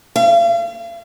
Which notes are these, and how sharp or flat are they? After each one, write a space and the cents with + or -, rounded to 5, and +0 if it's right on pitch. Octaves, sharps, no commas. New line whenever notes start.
F5 -40